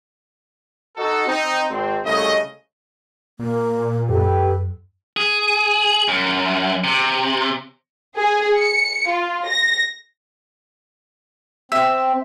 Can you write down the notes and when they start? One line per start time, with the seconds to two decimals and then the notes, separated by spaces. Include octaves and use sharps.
0.97 D#4 F#4 A4
1.28 C4 D#4
1.69 G#1 C4
2.05 C2 C#3 A3 D#5
3.39 A#2 A#3
4.09 F#2 G4 A4 B4
5.17 G#4
6.08 F#2
6.84 C3
8.16 G#4
8.57 C#7
9.08 F4
9.47 A#6
11.72 C4 E5